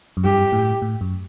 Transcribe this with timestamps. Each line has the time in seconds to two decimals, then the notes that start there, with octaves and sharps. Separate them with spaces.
0.17 F#2
0.25 G2 G4
0.52 A2
0.82 A2
1.01 F#2